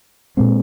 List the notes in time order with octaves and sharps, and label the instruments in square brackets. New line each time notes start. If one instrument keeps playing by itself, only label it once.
[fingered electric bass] A#2 G#3 C4